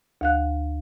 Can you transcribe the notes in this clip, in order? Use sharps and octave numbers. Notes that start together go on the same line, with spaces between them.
D2 F5 F#6